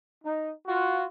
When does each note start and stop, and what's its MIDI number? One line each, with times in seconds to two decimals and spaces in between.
0.24 0.51 63
0.67 1.05 65
0.67 1.05 66